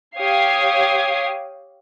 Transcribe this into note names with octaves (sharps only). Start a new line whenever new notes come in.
G4 C#5 F5 D#6 G#6 C7